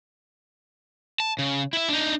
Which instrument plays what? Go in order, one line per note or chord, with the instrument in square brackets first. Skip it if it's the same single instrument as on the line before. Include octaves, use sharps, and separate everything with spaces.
[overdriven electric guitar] A5
C#3
E4 E5
D4 D#4